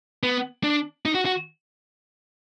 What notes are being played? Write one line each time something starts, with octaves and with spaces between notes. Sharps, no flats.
B3
D4
D#4
F#4
F#4